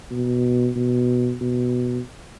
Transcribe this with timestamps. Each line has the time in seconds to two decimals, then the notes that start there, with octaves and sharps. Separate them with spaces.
0.11 B2
0.76 B2
1.41 B2